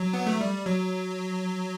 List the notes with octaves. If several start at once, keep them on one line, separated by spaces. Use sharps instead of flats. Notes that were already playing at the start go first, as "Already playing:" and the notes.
Already playing: F#3
B3
A3
G3
F#3